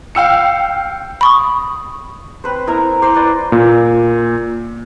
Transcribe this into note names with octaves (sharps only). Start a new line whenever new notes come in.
F5 G5 E6 C#7
B5 C#6 D#6
C4 B4 C5
E4 A#4 E5 A#5
C5 C6 D6
B4 D5
A#2